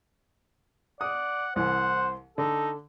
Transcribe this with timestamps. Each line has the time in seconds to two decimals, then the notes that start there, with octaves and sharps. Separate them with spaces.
1.01 D5 F#5 D#6
1.56 C2 E3 C5 F#5
2.38 D3 D#4 A4